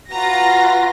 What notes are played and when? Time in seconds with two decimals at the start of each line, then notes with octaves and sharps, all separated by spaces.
0.10 F4 F#4 B4 A#5 A#6